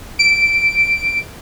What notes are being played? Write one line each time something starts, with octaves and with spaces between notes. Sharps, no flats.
D7